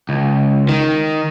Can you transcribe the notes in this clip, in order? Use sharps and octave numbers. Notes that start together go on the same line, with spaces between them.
C#2
D#3